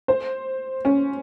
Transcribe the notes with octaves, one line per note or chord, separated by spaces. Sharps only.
C5
C#4